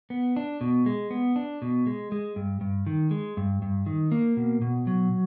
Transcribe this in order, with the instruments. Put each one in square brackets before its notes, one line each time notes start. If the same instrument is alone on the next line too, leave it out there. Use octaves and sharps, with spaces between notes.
[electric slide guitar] B3
D4
B2
G#3
B3
D4
B2
G#3
G#3
G2
G2
D#3
G#3
G2
G2
D#3
A#3
B2
B2
F#3